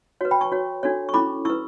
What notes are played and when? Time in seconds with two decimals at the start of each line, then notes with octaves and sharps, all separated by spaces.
0.21 F#4 B4 C#5
0.31 G5 B5
0.41 A5 C#6
0.52 F#4 C#5
0.83 D4 F#4 A4 C#5
1.09 C#6
1.13 C#4 E4 A4 B5 D6
1.45 E4 B4 C#6 E6